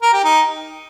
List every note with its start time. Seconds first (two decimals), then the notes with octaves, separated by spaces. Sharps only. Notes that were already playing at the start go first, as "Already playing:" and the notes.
0.02 A#4
0.13 G4
0.24 D#4